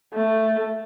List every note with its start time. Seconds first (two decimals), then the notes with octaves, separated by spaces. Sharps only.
0.13 A3